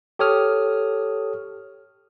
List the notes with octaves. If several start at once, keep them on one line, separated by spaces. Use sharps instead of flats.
G4 A4 C#5 D#6 F6